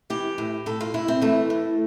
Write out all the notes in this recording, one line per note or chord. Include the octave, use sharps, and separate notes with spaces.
E3 G4
A2
A2 A4
F4
A2 E4
C4
E3 A3
A2